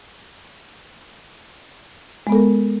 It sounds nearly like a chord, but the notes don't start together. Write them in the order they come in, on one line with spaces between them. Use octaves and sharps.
G#3 B3 A4 A#4